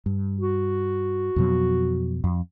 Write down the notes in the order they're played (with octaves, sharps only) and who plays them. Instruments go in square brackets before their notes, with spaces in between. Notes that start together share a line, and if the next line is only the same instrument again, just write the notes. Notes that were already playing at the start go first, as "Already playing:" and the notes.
[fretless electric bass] G2
[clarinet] F#4
[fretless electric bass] F2 B2 F#3
F2